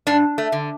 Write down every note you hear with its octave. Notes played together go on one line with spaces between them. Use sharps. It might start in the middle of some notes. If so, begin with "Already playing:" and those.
G2 D4
A3
D3